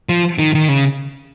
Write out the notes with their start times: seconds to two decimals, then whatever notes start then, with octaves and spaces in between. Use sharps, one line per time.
0.09 F3
0.39 D#3
0.54 D#3
0.69 C#3